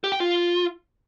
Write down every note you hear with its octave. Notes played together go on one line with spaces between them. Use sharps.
G4
G5
F4